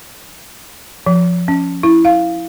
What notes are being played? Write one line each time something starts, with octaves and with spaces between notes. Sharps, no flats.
F3
C#4
E4
F5